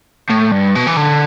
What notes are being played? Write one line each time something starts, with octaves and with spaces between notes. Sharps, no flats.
A2
G2
B2
E3
D3